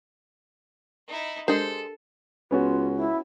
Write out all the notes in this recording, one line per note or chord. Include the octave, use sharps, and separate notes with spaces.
D#4 E4
G#3 D4 G4 A4 A#4 C5
C#2 B3 C#4 F4 F#4
E4